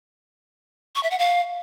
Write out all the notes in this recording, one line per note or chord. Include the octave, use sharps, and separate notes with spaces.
C#6
E5
F#5
F5